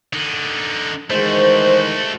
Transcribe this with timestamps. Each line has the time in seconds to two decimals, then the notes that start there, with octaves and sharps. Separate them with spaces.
0.13 D3 D#4
1.10 D#3 E3 G#3 A3 F#4 C5